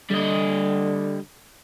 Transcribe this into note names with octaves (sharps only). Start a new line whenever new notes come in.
D3 G3 D#5